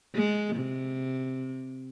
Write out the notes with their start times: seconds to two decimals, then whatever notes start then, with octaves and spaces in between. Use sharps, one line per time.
0.15 G#3
0.56 C3